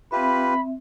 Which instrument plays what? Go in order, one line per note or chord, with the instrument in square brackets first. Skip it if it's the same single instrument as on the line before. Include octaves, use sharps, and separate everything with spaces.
[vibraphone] C4 E5 [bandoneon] F4 G4 B4 [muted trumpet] B5